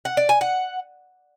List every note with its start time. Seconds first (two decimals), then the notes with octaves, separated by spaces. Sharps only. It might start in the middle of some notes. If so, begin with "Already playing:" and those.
0.05 F#5
0.17 D5
0.29 G#5
0.41 F#5